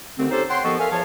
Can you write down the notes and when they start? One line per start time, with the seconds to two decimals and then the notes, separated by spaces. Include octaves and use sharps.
0.18 D#2 D3 A3 C4
0.31 C#4 D#4 G4 A4 C5
0.50 C#5 F#5 G5 C6
0.64 D#2 F3 B3 A4 D#5 C#6
0.79 A4 A#4 E5 F5 G#5
0.91 E2 F3 B4 C#5 F5 A5